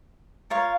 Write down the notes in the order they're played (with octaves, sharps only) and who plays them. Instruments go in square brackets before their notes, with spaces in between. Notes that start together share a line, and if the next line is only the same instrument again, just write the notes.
[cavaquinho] F4 A#4 C#5 F5